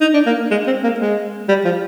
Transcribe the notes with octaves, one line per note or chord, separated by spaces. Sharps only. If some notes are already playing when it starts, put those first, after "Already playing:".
D#4
D4
A#3
G#3
C4
A#3
G#3
G3
F3